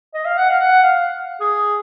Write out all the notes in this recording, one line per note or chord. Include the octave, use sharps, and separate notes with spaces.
D#5
F5
F#5
F5
F#5
F5
G#4